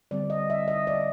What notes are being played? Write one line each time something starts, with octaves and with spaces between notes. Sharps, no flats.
D3 G3 C4 D5
D#5
E5
D#5
D5